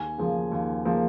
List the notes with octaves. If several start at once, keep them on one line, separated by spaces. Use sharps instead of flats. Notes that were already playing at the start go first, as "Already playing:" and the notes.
Already playing: D#2 G#5
C#3 F3 A#3
D#2
C#3 F3 A#3